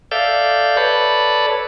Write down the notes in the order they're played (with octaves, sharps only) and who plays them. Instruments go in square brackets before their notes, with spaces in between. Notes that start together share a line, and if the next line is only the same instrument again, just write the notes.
[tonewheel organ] A4 D5 E5 F5 G6
A4 B4 C#5 D5 A5 B5